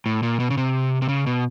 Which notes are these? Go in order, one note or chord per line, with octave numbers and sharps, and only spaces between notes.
A2
A#2
B2
C#3
C3
C3
C#3
B2